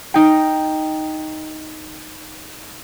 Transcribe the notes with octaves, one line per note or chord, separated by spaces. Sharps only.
D#4 G5